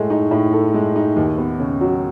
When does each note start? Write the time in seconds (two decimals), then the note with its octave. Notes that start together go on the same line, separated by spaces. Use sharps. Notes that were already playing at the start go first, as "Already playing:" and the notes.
Already playing: A2 G#3 A4
0.10 D#4
0.31 A2
0.53 A4
0.74 G#3
0.96 D#4
1.16 D#2
1.38 B3
1.60 C#3
1.81 F#3